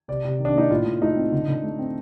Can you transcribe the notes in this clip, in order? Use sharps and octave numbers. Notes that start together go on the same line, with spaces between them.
C3 D5
C3
D#3
D4
A#3 D#4
A2 F4
A2
A3 D#4
C4
D3
D3
A3
C4